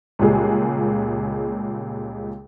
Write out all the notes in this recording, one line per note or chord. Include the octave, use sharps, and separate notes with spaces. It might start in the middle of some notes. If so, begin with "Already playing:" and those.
C#2 A#2 G3 G#3 G#4